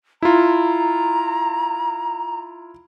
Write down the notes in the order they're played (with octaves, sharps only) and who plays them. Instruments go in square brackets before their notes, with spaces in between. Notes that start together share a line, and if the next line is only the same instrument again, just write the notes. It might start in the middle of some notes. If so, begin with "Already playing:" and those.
[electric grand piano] E4 F4 [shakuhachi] A#5